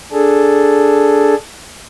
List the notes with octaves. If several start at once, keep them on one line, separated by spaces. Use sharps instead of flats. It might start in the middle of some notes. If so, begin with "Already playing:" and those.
D4 G#4 A4